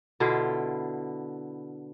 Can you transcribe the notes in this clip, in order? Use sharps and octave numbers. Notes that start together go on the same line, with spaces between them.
B2 D3 E4 F4